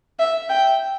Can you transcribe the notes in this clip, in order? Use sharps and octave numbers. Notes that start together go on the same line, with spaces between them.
E5
G5